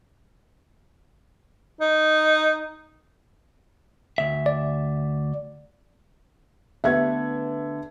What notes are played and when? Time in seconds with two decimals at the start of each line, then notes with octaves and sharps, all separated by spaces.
1.81 D#4
4.18 D2 E5
4.46 D5
6.84 D3 A3 B3 E5 G#6